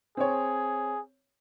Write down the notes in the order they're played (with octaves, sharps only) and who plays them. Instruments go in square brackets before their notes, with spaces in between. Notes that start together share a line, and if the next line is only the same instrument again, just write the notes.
[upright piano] C4 C#5 [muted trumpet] G#4